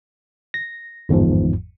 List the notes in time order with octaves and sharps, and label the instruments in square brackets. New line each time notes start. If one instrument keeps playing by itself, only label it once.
[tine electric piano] A#6
G1 E2 G#2 F3